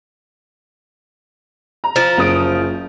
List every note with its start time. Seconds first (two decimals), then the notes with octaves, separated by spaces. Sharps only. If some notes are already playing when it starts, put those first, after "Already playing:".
1.84 A#5
1.96 F3
2.18 F#1 D#6 D7